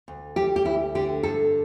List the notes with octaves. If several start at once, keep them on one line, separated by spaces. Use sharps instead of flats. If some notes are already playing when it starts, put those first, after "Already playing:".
D2
G3 G4
G4
D2 E4
D3 G4
G2 A4